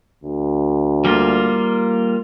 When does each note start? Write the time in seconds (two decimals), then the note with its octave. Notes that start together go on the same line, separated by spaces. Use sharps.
0.24 D2
1.05 G3 A#3 F4